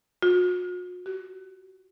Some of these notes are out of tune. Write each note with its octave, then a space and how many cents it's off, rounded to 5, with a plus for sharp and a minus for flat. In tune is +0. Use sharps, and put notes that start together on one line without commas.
F#4 -45
F#4 +40